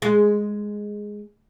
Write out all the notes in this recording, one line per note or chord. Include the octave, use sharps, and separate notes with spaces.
G#3